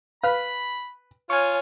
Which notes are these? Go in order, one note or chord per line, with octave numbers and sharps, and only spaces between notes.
B4 F5 B5 F6
F4 C#5 G#5 C#6 F6